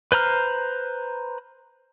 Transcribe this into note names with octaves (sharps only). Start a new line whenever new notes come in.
B4 C5 A#5 F6